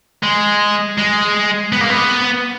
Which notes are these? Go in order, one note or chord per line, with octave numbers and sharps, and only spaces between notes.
G#3
G#3
B3
A#3
B3